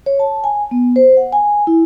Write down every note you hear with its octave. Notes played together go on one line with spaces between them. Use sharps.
C#5
A5
G#5
B3
C5
F#5
G#5
E4